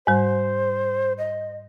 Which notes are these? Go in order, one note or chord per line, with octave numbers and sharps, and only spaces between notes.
G#2 G3 C5
D#5